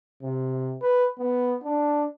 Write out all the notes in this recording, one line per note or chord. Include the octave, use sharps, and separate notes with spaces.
C3
B4
B3
D4